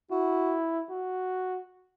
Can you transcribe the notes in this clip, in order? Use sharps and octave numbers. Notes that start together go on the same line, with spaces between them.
E4 F#4
F#4